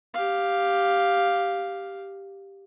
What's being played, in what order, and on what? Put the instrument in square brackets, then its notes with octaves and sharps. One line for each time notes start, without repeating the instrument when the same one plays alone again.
[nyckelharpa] G4 F5